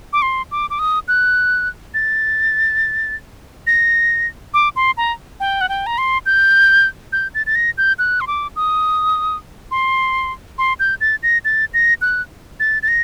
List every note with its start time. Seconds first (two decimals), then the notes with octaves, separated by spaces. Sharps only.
0.13 D6
0.22 C6
0.51 D6
0.70 D6
0.79 D#6
1.08 F#6
1.94 A6
3.67 A#6
4.54 D6
4.76 C6
4.97 A#5
5.40 G5
5.61 F#5
5.69 G5
5.86 A#5
5.98 C6
6.26 G6
7.13 G6
7.34 A6
7.46 A6
7.55 A#6
7.78 G6
7.99 F#6
8.21 C6
8.27 D6
8.56 D#6
9.71 C6
10.58 C6
10.80 G6
11.01 A6
11.23 A#6
11.45 A6
11.74 A#6
12.02 F#6
12.60 A6
12.83 A6
12.88 A#6